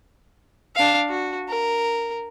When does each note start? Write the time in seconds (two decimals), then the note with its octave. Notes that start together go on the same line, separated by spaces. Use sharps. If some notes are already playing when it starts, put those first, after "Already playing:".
0.76 D4 F5
1.09 F#4
1.49 A#4